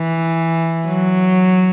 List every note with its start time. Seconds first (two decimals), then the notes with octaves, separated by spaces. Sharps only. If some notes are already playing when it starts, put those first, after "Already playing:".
Already playing: E3
0.86 F#3